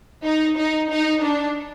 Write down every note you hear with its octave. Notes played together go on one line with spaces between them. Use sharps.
D#4
D#4
D#4
D4